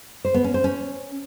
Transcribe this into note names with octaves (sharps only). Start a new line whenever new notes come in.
C5
B3
C#4
C5
C#4